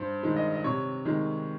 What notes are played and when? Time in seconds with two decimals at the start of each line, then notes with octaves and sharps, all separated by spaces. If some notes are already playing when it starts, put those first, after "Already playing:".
Already playing: G2 C5
0.23 D#3 G#3
0.36 D#5
0.54 D#5
0.64 C3 C#5
1.05 D#3 G#3